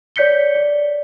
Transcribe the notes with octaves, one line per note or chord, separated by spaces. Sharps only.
C#5 D5 G6 B6 C#7 G7
D5